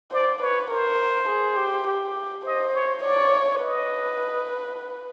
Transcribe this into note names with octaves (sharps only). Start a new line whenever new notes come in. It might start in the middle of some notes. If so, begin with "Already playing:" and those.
C5 D5
B4 C#5
A#4 C5
G#4
G4
G4
C5 D#5
C#5
C#5 D5
B4 D#5